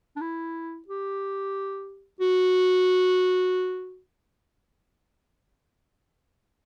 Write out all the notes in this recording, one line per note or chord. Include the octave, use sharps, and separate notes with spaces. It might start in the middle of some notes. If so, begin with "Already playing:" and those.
D4
E4
G4
F#4